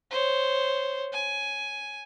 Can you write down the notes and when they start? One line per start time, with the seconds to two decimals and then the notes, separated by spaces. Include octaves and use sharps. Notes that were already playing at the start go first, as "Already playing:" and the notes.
0.11 C5 C#5
1.13 G#5